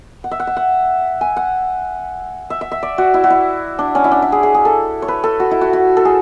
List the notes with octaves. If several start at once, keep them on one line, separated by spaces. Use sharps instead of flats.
F#5
E5
F#5
E5
F#5
G#5
F#5
E5
E5
E5
D5
F#4
E4
F#4
E4
D4
C#4
E4
D4
E4
G#4
G#4
G#4
A4
C#5
B4
A4
F#4
E4
F#4
F#4
A4
G#4